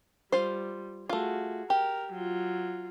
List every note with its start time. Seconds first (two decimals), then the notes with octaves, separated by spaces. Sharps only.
0.32 G3 F4 C5
1.09 A3 F4 F#4 G#4
1.70 G4 A#4
2.13 F#3 F4